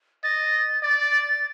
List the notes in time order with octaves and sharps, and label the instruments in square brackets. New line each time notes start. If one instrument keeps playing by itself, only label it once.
[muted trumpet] D#5 [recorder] A6
[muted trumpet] D5 [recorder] A6